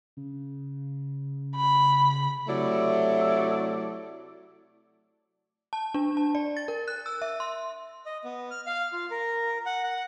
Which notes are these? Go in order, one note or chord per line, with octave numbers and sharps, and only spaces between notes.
C#3
B5
C3 F#3 A3 E4 D5
A5
D4
A5
D5
A6
A#4
F#6
E6
E5
C6
D#5
B3
F6
F5
F4
A#4
F#5
F#5